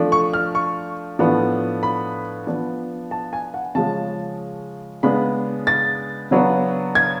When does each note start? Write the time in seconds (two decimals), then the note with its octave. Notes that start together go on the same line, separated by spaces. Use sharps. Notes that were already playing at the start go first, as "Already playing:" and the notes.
Already playing: F3 A3 D4
0.12 C#6
0.33 F6
0.55 C#6
1.19 A2 F3 B3 D4
1.83 B5
2.47 F3 B3 D4
3.11 A5
3.33 G#5
3.54 F#5
3.75 C#3 F3 G#3 C#4 A5
5.03 C#3 G#3 B3 D4 B5
5.67 A6
6.31 C#3 F#3 B3 D4
6.95 G#6